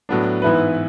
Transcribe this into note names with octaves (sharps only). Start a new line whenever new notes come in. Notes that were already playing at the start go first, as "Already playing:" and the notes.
A2 F#3 B3 D4
G#2 E3 B3 E4 B4